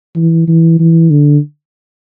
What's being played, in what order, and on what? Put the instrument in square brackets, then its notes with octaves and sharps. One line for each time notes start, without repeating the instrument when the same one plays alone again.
[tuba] E3
E3
E3
D3